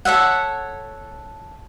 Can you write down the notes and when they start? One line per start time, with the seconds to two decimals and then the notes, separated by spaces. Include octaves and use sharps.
0.05 A4 C#5 E5 F#5